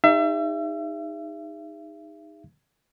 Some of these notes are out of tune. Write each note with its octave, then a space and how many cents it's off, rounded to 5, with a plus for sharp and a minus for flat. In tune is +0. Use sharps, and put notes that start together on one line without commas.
D#4 +0 G#4 -45 E5 +35